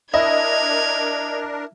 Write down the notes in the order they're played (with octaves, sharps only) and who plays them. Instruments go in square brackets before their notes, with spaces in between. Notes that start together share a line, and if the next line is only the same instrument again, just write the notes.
[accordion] D4 A#4 [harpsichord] E4 [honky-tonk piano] D#5 [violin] G#6 F7